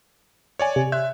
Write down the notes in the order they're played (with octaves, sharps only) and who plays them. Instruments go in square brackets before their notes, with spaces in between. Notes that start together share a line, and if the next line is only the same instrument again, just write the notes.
[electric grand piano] C#5 D5 G#5
[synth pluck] C3
[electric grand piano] E5 [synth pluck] C6 F#6